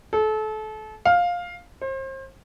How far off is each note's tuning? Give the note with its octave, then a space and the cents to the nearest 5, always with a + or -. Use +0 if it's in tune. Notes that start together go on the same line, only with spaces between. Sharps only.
A4 -30
F5 +10
C5 +35